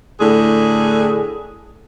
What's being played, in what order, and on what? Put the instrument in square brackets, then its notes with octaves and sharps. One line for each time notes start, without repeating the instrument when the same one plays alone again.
[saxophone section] A2 D3 G#4